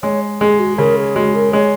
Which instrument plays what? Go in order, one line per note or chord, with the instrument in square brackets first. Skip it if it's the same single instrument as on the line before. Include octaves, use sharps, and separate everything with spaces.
[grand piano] G#3 [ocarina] C#5
[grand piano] G#3 [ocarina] G#4
[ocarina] F#4
[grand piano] C#3 [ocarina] A#4
[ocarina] G#4
[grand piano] G#3 [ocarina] F#4
[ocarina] A#4
[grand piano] G#3 [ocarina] C#5